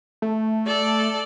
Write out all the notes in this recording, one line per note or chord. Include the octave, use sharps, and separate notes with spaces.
A3
A4 D5